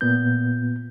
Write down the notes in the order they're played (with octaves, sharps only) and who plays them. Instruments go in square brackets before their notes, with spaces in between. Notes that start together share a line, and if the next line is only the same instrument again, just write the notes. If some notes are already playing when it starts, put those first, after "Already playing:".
[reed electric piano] A#2 B3 G6